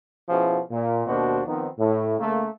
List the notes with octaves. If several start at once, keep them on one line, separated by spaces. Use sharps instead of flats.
B2 F3 C#4 E4 F#4 G#4
A#2
D#2 B2 A#3 D4 F#4 C5
D#3 F3 B3 C4 D#4
A2
C#3 A3 A#3